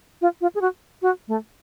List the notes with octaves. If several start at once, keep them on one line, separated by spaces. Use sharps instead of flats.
F4
F4
G#4
F#4
F#4
A3